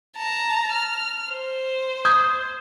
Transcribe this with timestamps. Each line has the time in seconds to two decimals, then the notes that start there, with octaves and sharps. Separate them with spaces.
0.17 A5 A#5
0.72 F6
1.32 C5
2.05 D#6 G6 G#6